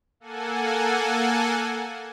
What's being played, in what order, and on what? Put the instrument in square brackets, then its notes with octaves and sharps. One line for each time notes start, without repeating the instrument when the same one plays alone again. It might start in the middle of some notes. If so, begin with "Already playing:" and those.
[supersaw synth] A#3 A4 F#5 G#5